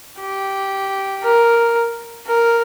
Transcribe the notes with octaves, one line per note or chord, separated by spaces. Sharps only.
G4
A#4
A#4